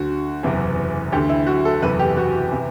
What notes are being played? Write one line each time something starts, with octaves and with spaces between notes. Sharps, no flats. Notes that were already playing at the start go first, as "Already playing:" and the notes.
Already playing: D2 D3 F#4
F#1 E2 C3 E3
D2 D3 G4
E4
F#4
A4
F#1 E2 C3 E3 B4
G4
F#4
C3 E3